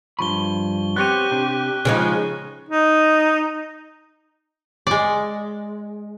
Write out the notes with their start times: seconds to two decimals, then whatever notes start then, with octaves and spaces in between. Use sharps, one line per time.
0.19 G2 F3 B5 C#6 G7
0.96 B3 C4 G4 C#5 F#6 D#7
1.31 C3 D4
1.85 C#3 F3 G#3 C#4 D#4
2.69 D#4
4.87 G#3 D5